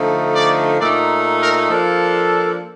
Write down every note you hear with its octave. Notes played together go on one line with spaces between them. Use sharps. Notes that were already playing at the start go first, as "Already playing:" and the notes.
Already playing: D3 F3 A3 D#4
D5
A#2 A3 D#4 D5
A#4
F3 A#3 D4 A4